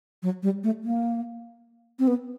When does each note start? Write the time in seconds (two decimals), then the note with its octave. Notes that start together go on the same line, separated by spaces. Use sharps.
0.23 F#3
0.43 G3
0.64 A3
0.84 A#3
1.99 C4
2.08 B3